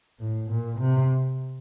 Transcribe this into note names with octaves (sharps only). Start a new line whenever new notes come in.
A2
A#2
C3